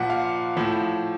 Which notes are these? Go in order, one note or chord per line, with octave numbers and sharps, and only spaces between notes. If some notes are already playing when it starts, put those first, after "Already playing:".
Already playing: A#2 F3 F#5
F5
A2 F3